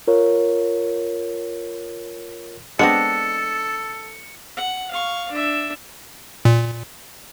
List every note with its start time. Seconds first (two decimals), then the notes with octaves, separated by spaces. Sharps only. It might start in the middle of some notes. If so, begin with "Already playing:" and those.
0.08 F4 A#4 C#5
2.79 G#3 B3 C4 D4 A4 D#5 C#7
4.57 F#5
4.91 F5 C#6
5.31 D4 E5
6.45 A#2